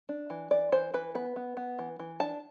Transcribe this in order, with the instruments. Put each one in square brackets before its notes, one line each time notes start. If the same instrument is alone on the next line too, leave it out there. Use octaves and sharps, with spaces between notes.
[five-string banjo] D4
E3
E3 D5
E3 C5
E3 B4
B3 B4
B3
B3
E3
E3
D4 A5